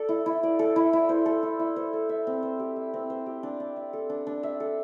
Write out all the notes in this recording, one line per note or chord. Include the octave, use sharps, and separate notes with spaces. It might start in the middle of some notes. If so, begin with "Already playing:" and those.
Already playing: A4 D5
E4
E4
D5
A4
E4
E4
C5
A4
E4
E4
C5
A4
E5
C4
C5
G4
E5
C4
C5
G4
D4
D4
E5
A4
D4
D4
E5
A4